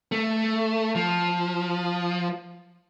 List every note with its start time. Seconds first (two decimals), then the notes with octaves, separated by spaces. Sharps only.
0.12 A3
0.95 F3